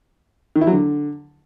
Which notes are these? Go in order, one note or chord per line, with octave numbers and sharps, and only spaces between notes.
D#3
E4
F#3
D3